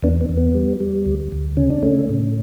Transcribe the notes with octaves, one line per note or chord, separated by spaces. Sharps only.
E2 B3 D4
B3
E2
B3
G3
G3
D2
D2
C#3 C#4
D4
C#3 A3 C#4
A2